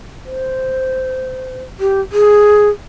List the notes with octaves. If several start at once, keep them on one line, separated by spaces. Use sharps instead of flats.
C5
G4
G#4